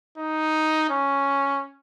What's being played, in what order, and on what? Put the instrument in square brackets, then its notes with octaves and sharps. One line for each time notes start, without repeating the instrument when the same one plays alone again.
[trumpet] D#4
C#4